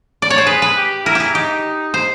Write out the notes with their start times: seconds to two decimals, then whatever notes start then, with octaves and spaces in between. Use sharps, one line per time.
0.22 D5
0.30 C#5
0.38 C5
0.46 G#4 B4
0.62 B4
0.77 G4
1.05 E4 A#4
1.15 G4 G#4
1.35 D#4 G4
1.94 C5